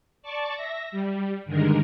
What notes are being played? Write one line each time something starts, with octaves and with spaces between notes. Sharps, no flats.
D5 A5 C#6 D6
E5 A#6
G3
G2 D3 D#3 G#3 A#4